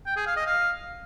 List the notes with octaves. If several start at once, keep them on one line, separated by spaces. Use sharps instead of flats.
G5
G#4
F5
D#5
F5